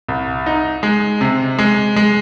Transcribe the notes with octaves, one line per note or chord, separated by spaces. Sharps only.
C2
D#4
G#3
C3
G#3
G#3